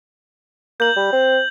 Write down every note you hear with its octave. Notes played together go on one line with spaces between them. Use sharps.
A#3 G6 F#7
G3
C4